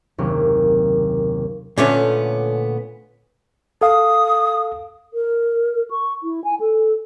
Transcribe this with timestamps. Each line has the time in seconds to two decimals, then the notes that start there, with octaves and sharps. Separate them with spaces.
0.18 F#1 D#2 C3 C#4
1.78 A#2 D3 A3 B3 C#4
3.81 A4 F5 D#6
5.14 A#4
5.91 C#6
6.23 E4
6.44 G#5
6.60 A4